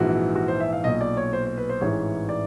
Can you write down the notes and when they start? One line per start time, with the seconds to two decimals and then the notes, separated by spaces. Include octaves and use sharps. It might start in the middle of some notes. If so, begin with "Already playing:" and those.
Already playing: A#1 G#2 E3 F#4
0.36 F#4
0.48 C5
0.60 E5
0.73 F5
0.84 B1 A#2 D#5
1.01 D5
1.17 C#5
1.33 C5
1.45 C5
1.57 B4
1.69 C5
1.81 A1 G#2 E3 C#5
2.29 D5